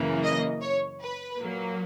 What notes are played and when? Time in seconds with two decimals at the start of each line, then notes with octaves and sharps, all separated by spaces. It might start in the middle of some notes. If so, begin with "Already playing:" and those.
Already playing: F#2 C#3 E3 A#3
0.23 D#5
0.61 C#5
1.00 B4
1.39 A#2 F#3 A#3